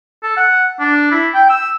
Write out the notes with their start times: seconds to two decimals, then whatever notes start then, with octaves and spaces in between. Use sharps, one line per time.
0.23 A4
0.37 F#5
0.80 D4
1.11 E4
1.34 G5
1.49 E6